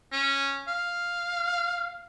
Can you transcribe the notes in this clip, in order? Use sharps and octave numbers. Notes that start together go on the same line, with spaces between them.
C#4
F5